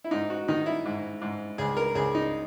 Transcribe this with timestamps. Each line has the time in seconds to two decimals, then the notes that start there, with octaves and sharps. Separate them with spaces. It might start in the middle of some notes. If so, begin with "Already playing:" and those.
0.04 E4
0.11 G#2 D#4
0.30 F#4
0.48 D#3 D#4
0.66 E4
0.85 G#2
1.22 G#2
1.58 C#2 G#4
1.77 A#4
1.95 C#2 G#4
2.15 D#4